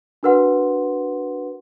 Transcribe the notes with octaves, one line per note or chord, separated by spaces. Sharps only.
D4 F#4 A#4 B4 F#5 C6